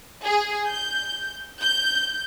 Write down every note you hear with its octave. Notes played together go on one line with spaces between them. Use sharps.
G#4
G6
G6